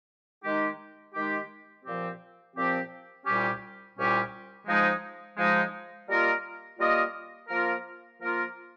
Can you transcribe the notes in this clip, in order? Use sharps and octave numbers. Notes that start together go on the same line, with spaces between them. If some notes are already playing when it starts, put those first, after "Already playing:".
D#3 G#3 D#4 G4
D#3 G#3 D#4 G4
A#2 F3 C4 G4
A#2 F3 C4 G4
C2 A#2 G3 C#4 G4
C2 A#2 G3 C#4 G4
F3 G#3 D#4
F3 G#3 D#4
G3 A#3 F4 A#4 D#5
G3 A#3 F4 A#4 D#5
F3 A#3 F4 A#4
F3 A#3 F4 A#4